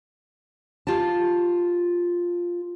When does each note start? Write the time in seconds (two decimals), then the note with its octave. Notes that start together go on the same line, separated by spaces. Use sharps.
0.87 F4 G4 A5